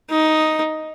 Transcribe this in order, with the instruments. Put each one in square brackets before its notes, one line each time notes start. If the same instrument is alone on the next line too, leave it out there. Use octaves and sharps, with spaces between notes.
[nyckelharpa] D#4